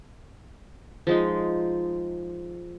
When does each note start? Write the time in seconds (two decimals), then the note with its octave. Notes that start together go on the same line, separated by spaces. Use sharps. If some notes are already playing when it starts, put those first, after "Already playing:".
1.07 F3 G#3 D#4